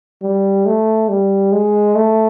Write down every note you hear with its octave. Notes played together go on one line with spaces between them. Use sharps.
G3
A3
G3
G#3
A3